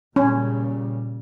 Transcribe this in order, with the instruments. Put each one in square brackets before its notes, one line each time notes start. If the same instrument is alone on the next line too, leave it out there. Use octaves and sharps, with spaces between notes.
[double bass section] A#2 C#3 G3 [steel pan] C#4